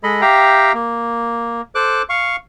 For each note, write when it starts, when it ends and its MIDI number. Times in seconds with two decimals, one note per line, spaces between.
0.03 0.21 56
0.03 0.21 69
0.03 0.21 75
0.03 0.21 83
0.21 0.72 67
0.21 0.72 76
0.21 0.72 77
0.21 0.72 79
0.21 0.72 82
0.74 1.61 58
1.75 2.02 69
1.75 2.02 72
1.75 2.02 86
1.75 2.02 90
2.09 2.36 77
2.09 2.36 85